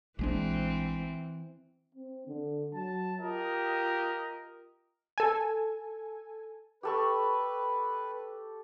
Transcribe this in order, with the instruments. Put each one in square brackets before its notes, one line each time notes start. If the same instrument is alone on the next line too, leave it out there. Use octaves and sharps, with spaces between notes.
[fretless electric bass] A#1 G#3 D4 [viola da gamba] E3 C4
[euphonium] C4
D3
[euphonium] F#3 [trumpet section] A5
[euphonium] F4 [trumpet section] G4 A#4 D#5
[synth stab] A4 G#5
[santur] G4 A4 C#6 [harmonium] B4